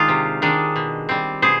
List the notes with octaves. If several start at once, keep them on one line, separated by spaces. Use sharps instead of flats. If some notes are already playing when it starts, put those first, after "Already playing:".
Already playing: D#3 G#3 D4 D#4 F4
C3
D#3 G#3 D4
B2
G3 C4
B2 G#4 C5